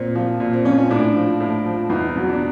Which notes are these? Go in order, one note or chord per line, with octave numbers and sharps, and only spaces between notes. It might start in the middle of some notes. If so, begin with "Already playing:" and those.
Already playing: A#2 C4
F3
A#2
C4
F3 C#4
C#4
A2 D4
F3
A2
F3
E2 D#4
B2 F#3
D4